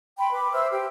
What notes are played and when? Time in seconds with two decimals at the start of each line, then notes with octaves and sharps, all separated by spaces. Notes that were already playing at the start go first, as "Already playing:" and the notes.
0.18 G5 B5 C6
0.32 B4 D6
0.52 C5 E5 E6 F6
0.72 G4